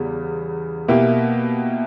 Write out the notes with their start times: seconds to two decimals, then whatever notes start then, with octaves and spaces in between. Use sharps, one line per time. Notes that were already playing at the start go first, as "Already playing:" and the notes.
Already playing: E2 C#3 G3 B3
0.88 B2 A#3 E4 G4